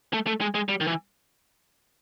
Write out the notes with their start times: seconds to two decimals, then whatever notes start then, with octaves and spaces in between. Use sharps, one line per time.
0.13 A3
0.27 A3
0.41 G#3
0.55 G#3
0.69 G3
0.81 D#3
0.87 E3